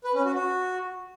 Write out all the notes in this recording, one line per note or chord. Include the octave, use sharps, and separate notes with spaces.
B4
C#4
F#4
F#4